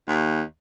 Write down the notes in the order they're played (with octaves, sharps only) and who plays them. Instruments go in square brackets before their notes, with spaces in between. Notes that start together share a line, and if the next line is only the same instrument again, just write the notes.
[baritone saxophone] D#2